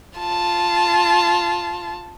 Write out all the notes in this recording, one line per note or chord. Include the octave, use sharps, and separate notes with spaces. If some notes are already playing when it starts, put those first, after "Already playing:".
F4 A5